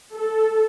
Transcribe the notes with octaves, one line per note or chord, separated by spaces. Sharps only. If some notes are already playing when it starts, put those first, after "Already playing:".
A4